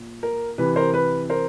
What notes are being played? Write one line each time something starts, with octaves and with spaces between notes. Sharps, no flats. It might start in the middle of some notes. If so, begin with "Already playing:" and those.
Already playing: A#2
A#4
C3 E3 B4
A#4 C5
B4
A#4 C5